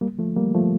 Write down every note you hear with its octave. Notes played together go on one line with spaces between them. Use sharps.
G3 A#3
F3 A3
G3 A#3
F3 A3